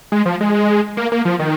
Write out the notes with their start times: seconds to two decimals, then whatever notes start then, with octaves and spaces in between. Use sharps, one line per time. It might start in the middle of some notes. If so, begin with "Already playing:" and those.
0.12 G#3
0.26 F3
0.41 G#3
0.97 A#3
1.12 A#3
1.25 F3
1.39 D#3